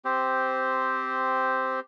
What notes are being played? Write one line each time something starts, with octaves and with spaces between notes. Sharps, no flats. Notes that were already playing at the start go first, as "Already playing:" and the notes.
C4 G4 C5